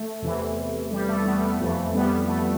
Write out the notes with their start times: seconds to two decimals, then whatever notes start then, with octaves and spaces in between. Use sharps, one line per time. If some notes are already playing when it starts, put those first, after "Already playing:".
Already playing: A3
0.22 E2 C3 E3
0.91 G3
1.08 A3
1.25 G3 B3
1.42 A3
1.59 F2 E3 A3
1.95 G3 B3
2.28 A3